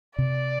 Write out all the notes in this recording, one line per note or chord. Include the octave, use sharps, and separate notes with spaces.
C3 D5